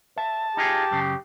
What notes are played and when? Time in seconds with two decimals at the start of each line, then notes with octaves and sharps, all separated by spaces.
0.18 E5 A5
0.57 D#4 F4 G4 G#4
0.91 F#2 C#3